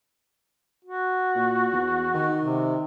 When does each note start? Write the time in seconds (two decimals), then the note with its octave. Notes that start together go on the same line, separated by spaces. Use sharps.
0.85 F#4
1.35 A#2
1.73 E2
2.14 D#3
2.41 C3